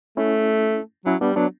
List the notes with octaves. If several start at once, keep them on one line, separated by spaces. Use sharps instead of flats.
A3 C#4 E4
F#3 C#4 E4
G3 B3 D4
F#3 B3 D4